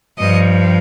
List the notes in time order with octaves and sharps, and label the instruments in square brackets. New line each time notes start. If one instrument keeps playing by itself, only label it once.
[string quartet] G2 F3 D#5